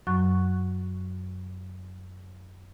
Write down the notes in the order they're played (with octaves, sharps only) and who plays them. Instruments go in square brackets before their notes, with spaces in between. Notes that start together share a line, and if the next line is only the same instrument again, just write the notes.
[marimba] F#2 F#3 C#6 F#6